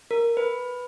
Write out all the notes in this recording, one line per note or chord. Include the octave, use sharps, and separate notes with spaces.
A#4
B4